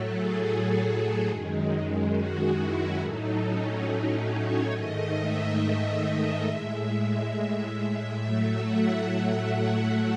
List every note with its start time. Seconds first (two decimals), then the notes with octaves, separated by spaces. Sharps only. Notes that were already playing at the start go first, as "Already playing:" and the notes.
Already playing: A2 F#3 A3 A4
0.11 G#4
1.27 F#2 D#3 G#3
2.13 F#4
2.56 E4
2.99 A2 F#3 A3 D#4
3.42 C#4
3.86 D#4
4.29 C#5
4.72 G#2 D#3 A3 D#5
5.15 E5
5.58 D#5
6.01 E5
6.45 A2 G#3
8.17 A2 F#3 A3 E5
8.61 F#5
9.04 E5